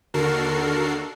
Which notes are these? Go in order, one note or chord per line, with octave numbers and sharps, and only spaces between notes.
D#2 D3 F#4 A4 A#4 C7